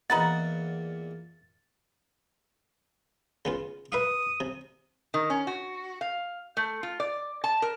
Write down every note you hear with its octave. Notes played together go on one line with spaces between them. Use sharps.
E2 A#2 D#4 B4 F#5 A6
C#3 B3 F4
B4 E5 F5 D#6
C3
D#3
C#4
F#4
F5
A3
F4
D5
A5
A#4